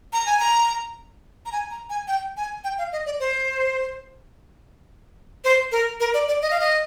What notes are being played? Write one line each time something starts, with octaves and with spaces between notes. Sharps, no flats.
A#5
G#5
A#5
A#5
G#5
A#5
G#5
G5
G#5
G5
F5
D#5
D5
C5
C5
A#4
A#4
D5
D5
D#5
F5
D#5